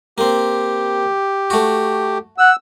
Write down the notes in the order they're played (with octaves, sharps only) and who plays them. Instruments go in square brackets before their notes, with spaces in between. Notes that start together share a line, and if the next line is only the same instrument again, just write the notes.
[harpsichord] A#3 C4 [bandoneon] G4
[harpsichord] A3 F#4
[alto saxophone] F#5 [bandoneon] E6